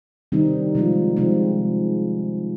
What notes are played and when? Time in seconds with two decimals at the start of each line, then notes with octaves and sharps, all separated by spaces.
0.32 C3 D#3 G3 C4 D#4
0.75 C3 F3 G#3 C4 F4
1.17 C3 F3 G#3 C4 F4